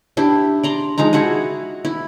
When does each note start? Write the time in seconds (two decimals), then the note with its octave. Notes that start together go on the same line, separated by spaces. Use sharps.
0.17 D4 E4 G4
0.63 D5 A#5 C6
0.98 F3 G#3 D#4 A#5
1.13 E4 F#4 F#5 G#5
1.85 E4